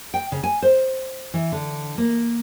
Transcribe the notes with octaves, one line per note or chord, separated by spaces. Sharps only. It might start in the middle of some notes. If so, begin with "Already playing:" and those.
G5
C#3
G#5
C5
E3
D3
A#3